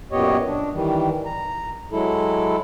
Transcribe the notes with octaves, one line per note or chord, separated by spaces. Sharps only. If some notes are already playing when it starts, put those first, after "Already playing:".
F#2 A#2 B3 G4 C#5 D#5
D4
D#3 E3 G3
A#5
F#3 G#3 E4 A4